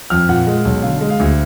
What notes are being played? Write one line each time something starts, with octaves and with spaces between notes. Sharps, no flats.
F2 F6
A#2 F#5
G#3
B1
D3 F5
G#3
F5
D2